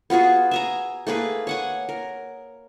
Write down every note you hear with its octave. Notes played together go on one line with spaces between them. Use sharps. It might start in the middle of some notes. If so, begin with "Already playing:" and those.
B3 F4 F#4 G#4
E5 G#5 A#5
A3 A#3 G#4 B4
C#5 F#5 G#5
A#4